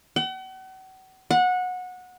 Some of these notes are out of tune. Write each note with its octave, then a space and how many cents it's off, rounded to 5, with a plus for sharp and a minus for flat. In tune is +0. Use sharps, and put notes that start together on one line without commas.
F#5 +40
F#5 -20